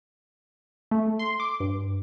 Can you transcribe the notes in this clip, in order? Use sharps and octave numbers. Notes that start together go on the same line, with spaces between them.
A3
C6
D6
G2